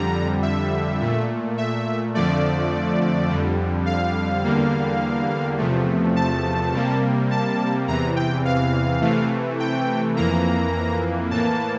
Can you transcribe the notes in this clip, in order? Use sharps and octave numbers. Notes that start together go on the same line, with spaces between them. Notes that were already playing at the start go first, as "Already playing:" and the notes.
Already playing: F2 D3 G3 A#5
E5
A#2 A3
E5
F2 D3 F3 A3 D5
F2 D3 G3
F5
E2 D3 G3 A#3
E2 C3 F3 A3
A5
C3 G3 A#3
A5
E2 C3 E3 A#5
G5
F5
C3 E3 A3
G5
F2 E3 A#3 A#5
A2 E3 A#3 A5